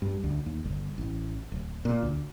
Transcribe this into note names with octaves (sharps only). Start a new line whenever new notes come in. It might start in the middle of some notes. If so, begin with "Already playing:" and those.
G2
D2
D#2
G1
A1
D1
A#2
D2